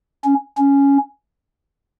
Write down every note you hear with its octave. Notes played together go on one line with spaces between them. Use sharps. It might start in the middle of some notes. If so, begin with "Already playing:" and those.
C#4
C#4